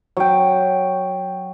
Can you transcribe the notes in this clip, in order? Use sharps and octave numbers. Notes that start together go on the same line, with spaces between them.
F#3 G5